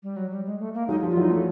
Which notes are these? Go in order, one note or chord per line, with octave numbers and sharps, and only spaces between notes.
G3
F#3
G3
G#3
A3
A#3
F#3 G#3 D#4
F3 G3
F4
E3 F#3 D#4
A3